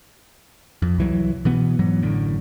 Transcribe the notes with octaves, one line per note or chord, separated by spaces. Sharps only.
F2
C2 E3 F#3
B2 E3 B3
G#2 E3 F#3 B3
A1 F#2 A2 D3